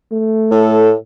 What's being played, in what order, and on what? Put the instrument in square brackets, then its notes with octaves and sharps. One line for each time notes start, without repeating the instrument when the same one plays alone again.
[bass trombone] A3
[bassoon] A2 [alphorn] A4